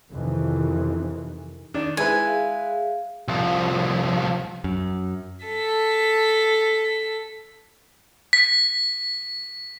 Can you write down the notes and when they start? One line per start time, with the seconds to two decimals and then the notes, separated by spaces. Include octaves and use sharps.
0.12 F2 C3 D#3 E3
1.74 D#3 D4
1.97 G#3 E4 B4 G#5
2.22 G#4 E5 F5
3.28 C2 F3
4.64 F#2
5.46 A4 B6
8.33 B6